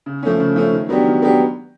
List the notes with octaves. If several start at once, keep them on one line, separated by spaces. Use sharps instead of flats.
C#3
F3 A3 C#4
C#3
F3 A3 C#4
D#3
F#3 B3 D4 G4
D#3
F#3 B3 D4 G4